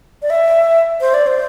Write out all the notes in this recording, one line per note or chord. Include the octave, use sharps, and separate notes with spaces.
D5
E5
C5
D5
C5